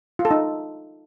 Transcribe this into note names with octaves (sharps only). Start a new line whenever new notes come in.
F4
A4
D#4